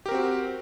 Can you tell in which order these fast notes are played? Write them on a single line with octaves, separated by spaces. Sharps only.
G4 A#4 C4 F#4